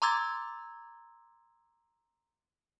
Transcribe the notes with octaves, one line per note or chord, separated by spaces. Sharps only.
A#5 C6 D6 E6 G#6 A6